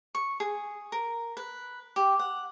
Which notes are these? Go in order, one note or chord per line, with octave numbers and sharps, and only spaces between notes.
C#6
G#4
A#4
B4
G4
F#5